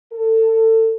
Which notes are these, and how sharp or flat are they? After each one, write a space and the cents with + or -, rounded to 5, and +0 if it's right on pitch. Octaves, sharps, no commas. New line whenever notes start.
A4 +25